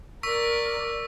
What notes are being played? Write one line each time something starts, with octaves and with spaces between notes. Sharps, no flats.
A#4 D5 C#6 E6 B6